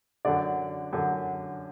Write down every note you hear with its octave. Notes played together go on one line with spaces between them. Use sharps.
F#2 D3 D5
F#2 D3